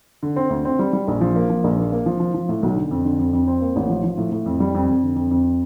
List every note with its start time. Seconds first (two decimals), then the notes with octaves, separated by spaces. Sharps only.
0.23 D3
0.36 C4
0.50 D2
0.65 C4
0.79 G3
0.93 G3
1.08 A#1
1.21 F3
1.36 A#3
1.50 F3
1.64 A#1
1.78 A#3
1.92 A#3
2.06 F3
2.20 F3
2.34 F3
2.49 A2
2.63 B1
2.76 D3
2.91 F2
3.05 D3
3.19 F2
3.33 F2
3.47 C4
3.61 A#3
3.76 A1
3.90 F3
4.04 F3
4.18 A2
4.32 A2
4.46 F2
4.60 G3
4.75 F2
4.89 F2
5.03 D3
5.16 F2
5.31 F2